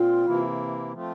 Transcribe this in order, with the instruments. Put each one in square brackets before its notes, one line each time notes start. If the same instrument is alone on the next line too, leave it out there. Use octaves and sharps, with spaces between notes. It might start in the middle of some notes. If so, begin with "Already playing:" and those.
Already playing: [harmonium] A#2 C4 [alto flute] F4
[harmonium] C3 E3 A#3 E4
F3 A3 C4 F4